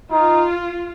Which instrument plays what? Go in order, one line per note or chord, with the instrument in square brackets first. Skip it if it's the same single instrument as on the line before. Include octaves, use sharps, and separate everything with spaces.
[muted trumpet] D#4 [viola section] F4